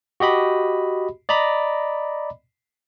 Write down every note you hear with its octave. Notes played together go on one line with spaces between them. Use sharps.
F#4 G4 D#5 B5
D5 D#5 A#5 B5